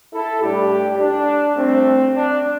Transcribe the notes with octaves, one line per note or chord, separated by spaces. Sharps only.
E4 A4
A2 G3 D4 G4
D4
C2 C3 A3 C4
D4